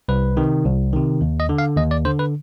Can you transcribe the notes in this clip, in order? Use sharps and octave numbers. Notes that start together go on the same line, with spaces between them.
C2 B4
C3 D#3
C2
C3 D#3
D#2
D#5
D3
F5
D#2 D#5
D5
D3 C5
B4